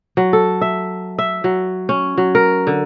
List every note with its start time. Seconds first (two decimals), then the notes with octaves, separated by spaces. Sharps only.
0.17 F#3
0.33 A4
0.61 E5
1.18 E5
1.44 F#3
1.89 C#4
2.18 F#3
2.35 A#4
2.67 D3